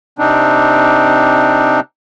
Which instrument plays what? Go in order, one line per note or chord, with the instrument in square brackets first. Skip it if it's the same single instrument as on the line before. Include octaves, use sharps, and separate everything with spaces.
[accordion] C3 C4 D4 D#4